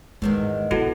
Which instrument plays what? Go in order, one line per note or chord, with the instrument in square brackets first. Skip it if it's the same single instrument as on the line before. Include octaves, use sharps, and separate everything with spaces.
[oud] E2 G#2 D#3 [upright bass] G#3
[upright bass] C3 F#3 [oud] B3 [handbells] E4 F#4 A4